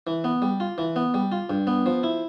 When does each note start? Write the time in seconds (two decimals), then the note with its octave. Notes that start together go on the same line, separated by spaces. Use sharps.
0.07 E3
0.24 B3
0.42 G3
0.60 F4
0.78 E3
0.96 B3
1.14 G3
1.32 F4
1.50 G2
1.67 B3
1.86 F3
2.03 E4